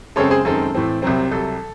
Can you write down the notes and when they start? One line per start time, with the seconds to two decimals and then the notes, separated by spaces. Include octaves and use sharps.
0.16 F#2 C#3 G#3 C4 A4 C#5
0.30 G#4 C5
0.45 F#2 D#3 G#3 C4 A4
0.75 A2 E3 C4
1.02 C2 C3 F#3 C4
1.31 C2 C3 F#3 A4